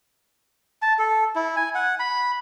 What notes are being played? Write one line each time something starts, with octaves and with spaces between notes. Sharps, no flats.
A5
A4
E4
G#5
F#5
B5